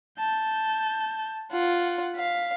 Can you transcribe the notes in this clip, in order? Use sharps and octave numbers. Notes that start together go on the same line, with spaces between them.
A5 G6
F4 F#5
F5 B6